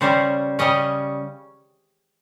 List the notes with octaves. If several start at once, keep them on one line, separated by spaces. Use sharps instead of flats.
C#3 G3 C#4 C5
C#3 G3 C#4 D#5